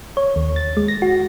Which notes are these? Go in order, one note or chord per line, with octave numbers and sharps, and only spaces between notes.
C#5
D#2
A6
G#3
A#6
F#4